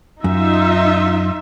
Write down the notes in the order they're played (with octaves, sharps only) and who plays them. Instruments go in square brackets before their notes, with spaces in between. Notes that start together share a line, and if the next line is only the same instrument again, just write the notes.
[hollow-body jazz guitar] F#2 [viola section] D#4 F4 E5